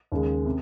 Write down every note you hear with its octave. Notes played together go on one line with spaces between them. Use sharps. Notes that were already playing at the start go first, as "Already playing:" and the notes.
D#2 C#3 G#3
C3